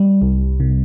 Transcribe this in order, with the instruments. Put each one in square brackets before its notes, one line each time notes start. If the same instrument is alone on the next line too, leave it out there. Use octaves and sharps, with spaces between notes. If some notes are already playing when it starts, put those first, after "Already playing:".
Already playing: [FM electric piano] G3
C2
C3